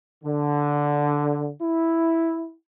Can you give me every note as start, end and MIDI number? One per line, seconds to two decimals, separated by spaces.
0.24 1.51 50
1.62 2.53 64